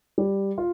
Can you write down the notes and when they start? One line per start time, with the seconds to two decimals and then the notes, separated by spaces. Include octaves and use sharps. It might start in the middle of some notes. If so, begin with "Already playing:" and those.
0.18 G3
0.58 F4